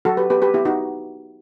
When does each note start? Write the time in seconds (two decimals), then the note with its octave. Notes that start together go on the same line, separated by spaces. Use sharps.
0.05 F#3 F#4 A4
0.17 G4 B4
0.30 B3 G4 B4
0.42 G4 B4
0.54 B3 E4 G4
0.65 D#4 F#4